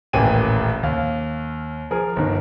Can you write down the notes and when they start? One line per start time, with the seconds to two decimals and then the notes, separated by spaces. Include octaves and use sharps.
0.13 D#1 A1 A#3 G5 G#5 D#7
0.83 D#2 F5
1.91 F3 G#4 A#4
2.16 G1 D#3